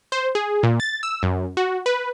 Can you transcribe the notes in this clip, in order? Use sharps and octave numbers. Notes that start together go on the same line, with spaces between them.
C5
G#4
A#2
A6
E6
F#2
F#4
B4